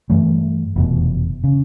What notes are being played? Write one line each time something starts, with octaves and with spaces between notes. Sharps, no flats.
G2 E3 A3
F1 E2 B2
C#3